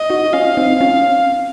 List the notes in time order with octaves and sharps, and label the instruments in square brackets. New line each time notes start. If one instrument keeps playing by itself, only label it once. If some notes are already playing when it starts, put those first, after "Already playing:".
Already playing: [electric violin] D#5
[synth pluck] D#4 F#4
[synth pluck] C#4 F4 [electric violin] F5
[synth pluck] C4 D#4
C#4 F4